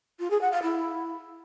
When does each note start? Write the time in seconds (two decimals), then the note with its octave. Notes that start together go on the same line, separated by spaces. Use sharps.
0.20 F4
0.30 G#4
0.41 F#5
0.52 F5
0.62 E4